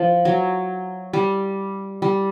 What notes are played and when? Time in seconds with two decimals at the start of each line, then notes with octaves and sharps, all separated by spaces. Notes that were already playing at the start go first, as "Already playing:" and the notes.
Already playing: F3
0.25 F#3
1.13 G3
2.02 G3